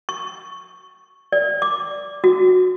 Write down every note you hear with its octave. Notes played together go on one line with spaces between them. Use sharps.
C#6
D5
D6
F#4